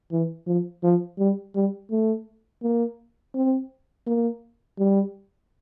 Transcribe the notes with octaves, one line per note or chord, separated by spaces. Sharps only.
E3
F3
F3
G3
G3
A3
A#3
C4
A#3
G3